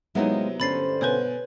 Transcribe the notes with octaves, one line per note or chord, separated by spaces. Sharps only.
C3 F#3 G#3 A#3 B3 D#4 E4
G2 D3 A3 C#4 C5 B5 A6 C7
B2 B4 C#5 G#5 G6